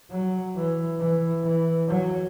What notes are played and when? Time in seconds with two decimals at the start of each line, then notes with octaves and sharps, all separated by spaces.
0.11 F#3
0.56 E3
0.99 E3
1.43 E3
1.88 F#3